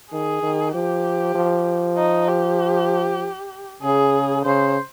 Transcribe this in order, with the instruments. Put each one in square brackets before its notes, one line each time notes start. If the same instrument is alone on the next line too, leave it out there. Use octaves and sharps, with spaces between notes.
[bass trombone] D#3 [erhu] G#4
[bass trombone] D#3
[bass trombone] F3 [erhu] G4
[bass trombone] F3
[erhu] D#4
G4
[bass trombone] C#3 [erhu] G#4
[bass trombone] C#3 [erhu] C5